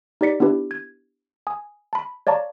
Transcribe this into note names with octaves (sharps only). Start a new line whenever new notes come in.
D#4 G4 D5 B6 C#7
B3 D4 E4 G4 B4
G#6
G#5 D#6
A5 B5
C#5 D5 F5 A5 A#5 C#6